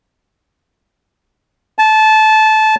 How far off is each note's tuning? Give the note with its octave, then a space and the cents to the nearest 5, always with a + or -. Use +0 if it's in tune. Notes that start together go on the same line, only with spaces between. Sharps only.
A5 -20